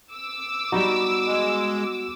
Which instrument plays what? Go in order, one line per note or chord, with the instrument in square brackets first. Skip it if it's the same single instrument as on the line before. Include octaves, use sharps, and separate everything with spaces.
[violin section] D6 E6
[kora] G3 B3 D#4 [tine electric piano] F#4
[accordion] G#3